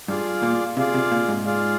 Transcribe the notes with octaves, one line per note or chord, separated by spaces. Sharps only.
G2 F4 G#4 D5 F5
A#2
C3 F4 G#4 D5 F5
C3
A#2
G#2
F4 G#4 D5 F5